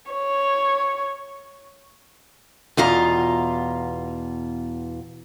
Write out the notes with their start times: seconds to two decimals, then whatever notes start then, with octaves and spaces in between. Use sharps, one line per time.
0.12 C#5
2.77 E2 B2 F4 A#5